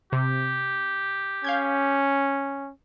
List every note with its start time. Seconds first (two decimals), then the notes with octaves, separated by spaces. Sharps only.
0.13 C3 G4
1.44 C#4 F5 G6 G#6